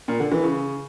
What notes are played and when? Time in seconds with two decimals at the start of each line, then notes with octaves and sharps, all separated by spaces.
0.08 A#2
0.20 D3
0.32 E3
0.43 C#3